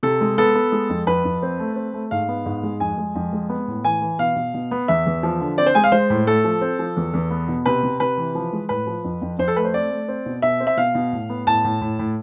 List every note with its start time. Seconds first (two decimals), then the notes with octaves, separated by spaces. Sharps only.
0.03 C3 A4
0.21 G#3
0.38 B3 A4
0.55 B3
0.72 G#3
0.90 F2
1.07 F2 B4
1.24 F2
1.42 C4
1.59 A3
1.76 C4
1.94 A3
2.11 G#2 F5
2.28 B3
2.46 G#2
2.63 G#3
2.80 F2 G#5
2.98 G#3
3.15 F2
3.33 G#3
3.49 B3
3.68 A2
3.84 E3 G#5
4.02 E3
4.19 B2 F5
4.36 B2
4.54 B2
4.71 B3
4.88 E2 E5
5.06 E2
5.23 F3
5.40 D3
5.58 C4 D5
5.66 C5
5.75 G#3 G#5
5.84 F5
5.92 G#3 C5
6.10 A2
6.27 A3 A4
6.44 F3
6.61 C4
6.79 F3
6.96 E2
7.14 E2
7.31 B3
7.48 B2
7.66 C3 B4
7.83 C3
8.00 C3 B4
8.17 E3
8.35 F3
8.53 G#3
8.69 A2 B4
8.87 F3
9.04 F2
9.22 F2
9.38 F2 C5
9.48 A4
9.56 A3 B4
9.65 C5
9.74 C4 D5
9.91 A3
10.08 C4
10.26 B2
10.42 B2 E5
10.60 C4
10.67 E5
10.77 B2 F5
10.95 B2
11.13 A2
11.29 B3
11.47 A2 A5
11.64 A2
11.81 A2
11.99 A2